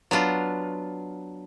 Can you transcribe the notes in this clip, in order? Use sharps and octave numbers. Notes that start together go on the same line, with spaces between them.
F#3 B3 D4 F4